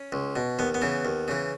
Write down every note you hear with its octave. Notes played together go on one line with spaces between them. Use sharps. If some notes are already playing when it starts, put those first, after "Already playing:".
Already playing: C#4
C#2
B2
D#2 B3
B3
C#3 E3
D#2
C#3 E3